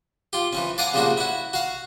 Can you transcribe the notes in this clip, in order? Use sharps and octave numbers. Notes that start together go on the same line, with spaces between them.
F4 G4
E3 F3 C#4
D5 F5 F#5 G#5 A#5 D6
C#3 F3 G3 A#3 D4 F#4
E4 F#4
F#4 F5